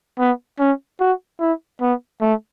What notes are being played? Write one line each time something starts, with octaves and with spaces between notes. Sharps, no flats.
B3
C#4
F#4
E4
B3
A3